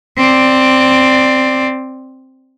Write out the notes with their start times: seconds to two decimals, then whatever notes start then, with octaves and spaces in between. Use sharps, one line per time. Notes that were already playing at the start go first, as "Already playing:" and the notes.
0.17 C4 D5